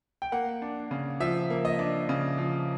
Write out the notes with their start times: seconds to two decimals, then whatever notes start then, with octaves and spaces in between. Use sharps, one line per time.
0.22 G5
0.32 A#3 F#5
0.62 D4
0.91 C#3
1.20 F3 E5
1.50 A#3
1.65 D#5
1.79 D4
2.09 C#3
2.38 F3